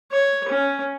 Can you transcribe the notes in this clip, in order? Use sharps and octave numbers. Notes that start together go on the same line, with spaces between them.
C#5
C#4